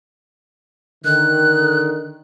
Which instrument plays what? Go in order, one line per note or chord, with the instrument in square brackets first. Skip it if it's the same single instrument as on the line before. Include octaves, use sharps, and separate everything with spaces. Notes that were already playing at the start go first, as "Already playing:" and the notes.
[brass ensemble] D3 D#3 [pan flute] F#6